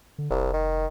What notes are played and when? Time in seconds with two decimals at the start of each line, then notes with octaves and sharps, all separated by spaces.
0.18 D3
0.30 F1 C2
0.54 D#3